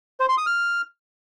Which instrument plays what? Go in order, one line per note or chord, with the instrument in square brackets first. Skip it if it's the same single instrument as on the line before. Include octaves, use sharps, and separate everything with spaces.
[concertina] C5
C6
D#6
F6